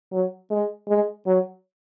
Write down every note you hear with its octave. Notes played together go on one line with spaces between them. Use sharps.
F#3
G#3
G#3
F#3